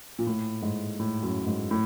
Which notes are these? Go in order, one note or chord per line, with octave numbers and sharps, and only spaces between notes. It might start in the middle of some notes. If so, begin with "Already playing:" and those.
A#2
A2
G#2
A2
F#2
G#2
A2